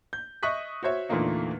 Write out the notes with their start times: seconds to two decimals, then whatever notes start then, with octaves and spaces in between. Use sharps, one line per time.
0.13 G6
0.43 D#5 E5 C#6 D#6 F#6 B6
0.83 F#4 C5 C#5 E5
1.09 E2 A#2 D3 A3 A#3 D#4